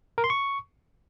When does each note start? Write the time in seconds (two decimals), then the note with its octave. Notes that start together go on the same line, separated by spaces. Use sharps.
0.18 A#4
0.24 C6
0.30 C#6